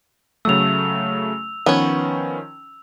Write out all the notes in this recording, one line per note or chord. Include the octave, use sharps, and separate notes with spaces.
C#3 F#3 A3 E6 F7
D#3 F3 B3 C#4 C#5